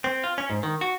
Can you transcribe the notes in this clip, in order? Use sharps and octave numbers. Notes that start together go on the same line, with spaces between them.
C4
F4
C#4
G#2
D#3
F#4